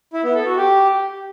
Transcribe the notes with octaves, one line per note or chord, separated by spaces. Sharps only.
E4
B3
A4
F#4
G4